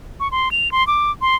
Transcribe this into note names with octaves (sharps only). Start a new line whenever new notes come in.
C#6
C6
F7
C6
D6
C6